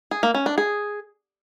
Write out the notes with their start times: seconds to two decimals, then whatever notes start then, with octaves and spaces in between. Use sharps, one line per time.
0.11 G#4
0.23 A#3
0.34 C#4
0.46 D4
0.58 G#4